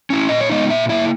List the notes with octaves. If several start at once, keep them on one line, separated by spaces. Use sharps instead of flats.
C#4 E4
A#2 D#5
C#5
G#3 B3 D#4 D#5
A#2 E5
A#3 E4 E5